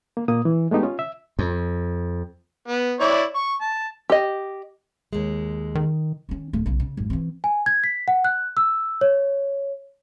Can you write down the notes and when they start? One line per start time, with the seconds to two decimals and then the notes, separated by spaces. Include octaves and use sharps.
0.17 A#3
0.28 A#2 A#3 D#6
0.45 E3
0.71 G#3 A3 B3 D#4 G4
0.83 C#4 F4
0.99 E5
1.39 F2
2.68 B3
3.00 E4 C#5 D5
3.35 C#6
3.61 A5
4.10 G4 D#5
5.13 D#2 G#3
5.75 D#3
6.29 D#3 C#4
6.53 D1 A3
6.66 B1 C#3
6.80 C#3
6.97 G#1 F#2
7.10 E3 C4
7.44 G#5
7.66 G#6
7.84 B6
8.08 F#5
8.25 F#6
8.57 E6
9.01 C#5